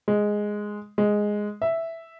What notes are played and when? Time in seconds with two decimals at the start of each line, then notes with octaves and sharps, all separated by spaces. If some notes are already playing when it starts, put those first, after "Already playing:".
0.08 G#3
0.98 G#3
1.62 E5